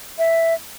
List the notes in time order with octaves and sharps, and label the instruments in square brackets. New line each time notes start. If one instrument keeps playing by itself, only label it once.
[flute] E5